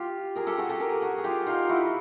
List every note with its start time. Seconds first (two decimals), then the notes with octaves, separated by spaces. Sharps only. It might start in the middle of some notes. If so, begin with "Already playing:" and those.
Already playing: F4 G4
0.36 G#4 A#4
0.47 G4 A4
0.58 F#4 G#4
0.69 G4 A4
0.80 G#4 A#4
1.02 F#4 G#4
1.18 G#4
1.24 F4 G4
1.47 D#4 F4
1.69 E4 F#4